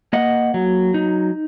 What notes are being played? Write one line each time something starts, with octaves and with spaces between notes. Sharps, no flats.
A#3 D#5 F#5
F#3
D#4